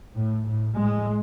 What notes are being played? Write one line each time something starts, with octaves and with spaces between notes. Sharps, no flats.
A2
A2
A2 G#3